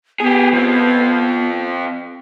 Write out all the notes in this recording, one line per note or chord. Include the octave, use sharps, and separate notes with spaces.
B3 G4 G#4
F3 C4